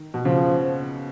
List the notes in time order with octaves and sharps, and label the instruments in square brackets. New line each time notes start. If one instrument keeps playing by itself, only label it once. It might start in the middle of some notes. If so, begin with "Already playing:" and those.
Already playing: [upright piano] D#3
B2
[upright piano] C#3 [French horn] F3